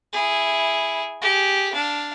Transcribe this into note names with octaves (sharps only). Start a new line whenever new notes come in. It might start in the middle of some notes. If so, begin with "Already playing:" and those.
E4 G#4
G4 G#4
D4 F5